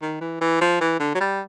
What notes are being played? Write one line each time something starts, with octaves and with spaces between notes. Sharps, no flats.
D#3
E3
E3
F3
E3
D3
F#3
G3